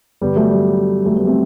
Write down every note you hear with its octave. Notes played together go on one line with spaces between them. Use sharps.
G2 D3 G3 B3
F#3 A3
G3
F#3 A3
G3 B3
A3 C4